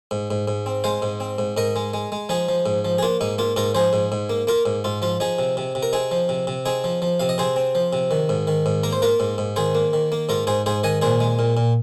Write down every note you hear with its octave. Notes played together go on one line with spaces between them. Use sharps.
G#2
G#2
G#2
C4
G#3 C5 F5
G#2
C4
G#2
G#2 A#4 D#5
G#3
G#3
G#3
F3 D#4 G#4
F3
G#2
F3
G#4
A#3 F4
G#2 D#4
A#3 F4
G#2 F4 A#4
F3 G#4 C5
G#2
G#2
A#3
A#3 F4 A#4
G#2
G#2 F4
F3 F4
F3 D#4 G#4
C3
C3
C3
A#4
C4 D#4 G#4
F3
C3
C3
C4 D#4 G#4
F3
F3
C3 F5
D#5
C3 G#4 C5
C4
F3
C3
D#3
G#2
D#3
G#2
A#3 A#4
C5
A#3 F4 A#4
G#2
G#2
D#3 G#4 C5
A#3
D#3
A#3
G#2 F4 A#4
G#2 G#4 C5
G#2 G#4 C5
D#3 D#5 G#5
A#2 G#4 C5
G#3
A#2
A#2